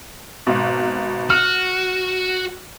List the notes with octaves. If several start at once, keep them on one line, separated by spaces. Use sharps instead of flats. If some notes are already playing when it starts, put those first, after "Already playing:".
G#1 B2
F#4 F6